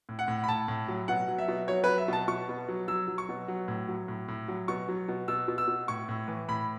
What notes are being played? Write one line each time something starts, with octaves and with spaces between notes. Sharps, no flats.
A2
F#5
A2
B5
A2 A5
A2
F#3
B2 F#5
F#3
E5
B2
F#3 C#5
B4
F#3
E5
B2 A5
B2 C#6
B2
F#3
F#3 E6
F#3
C#6
B2
F#3
A2
F#3
A2
A2
F#3
B2 C#6
F#3
B2
B2 E6
B2
E6
B2
A2 C#6
A2
E3
A2 B5